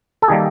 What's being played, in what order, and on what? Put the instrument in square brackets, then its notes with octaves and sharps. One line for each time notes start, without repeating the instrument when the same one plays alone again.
[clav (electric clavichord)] A4
D#3 G3 A#3 G#4